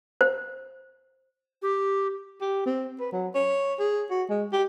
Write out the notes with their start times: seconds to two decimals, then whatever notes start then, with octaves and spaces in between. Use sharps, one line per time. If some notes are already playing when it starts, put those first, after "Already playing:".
0.21 C5
1.62 G4
2.41 G4
2.66 C4
3.00 B4
3.12 F#3
3.35 C#5
3.80 G#4
4.10 F#4
4.30 G#3
4.53 G4